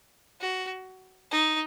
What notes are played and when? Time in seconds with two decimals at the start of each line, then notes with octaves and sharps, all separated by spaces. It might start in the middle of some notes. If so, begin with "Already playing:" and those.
0.40 F#4
1.31 D#4